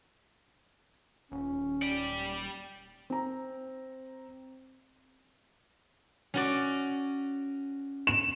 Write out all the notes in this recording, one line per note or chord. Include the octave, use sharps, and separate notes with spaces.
D#1 C#4
G4 D5
C4 A#5
C#4 F#4 D5
E7